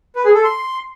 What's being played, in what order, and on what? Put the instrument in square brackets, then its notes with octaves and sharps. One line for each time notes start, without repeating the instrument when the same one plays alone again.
[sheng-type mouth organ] B4
G#4
A4
C6